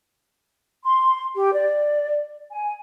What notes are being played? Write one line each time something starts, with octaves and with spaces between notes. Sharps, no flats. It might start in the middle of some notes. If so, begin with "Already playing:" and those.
C6
G4
D5
G#5